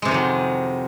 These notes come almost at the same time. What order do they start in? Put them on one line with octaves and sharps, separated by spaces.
G#3 C3 F2 D#3 F#3